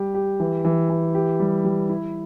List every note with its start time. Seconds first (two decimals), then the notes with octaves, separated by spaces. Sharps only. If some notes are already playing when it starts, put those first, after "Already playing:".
Already playing: G3 G4
0.14 G4
0.40 E3
0.65 E3
0.89 E3
1.15 G4
1.40 G3
1.64 G3
1.89 E4